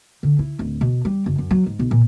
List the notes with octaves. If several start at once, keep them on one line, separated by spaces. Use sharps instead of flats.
D3
E4
D1
B2
G3
F#1
F#2
F#3
G#2
B1
A#2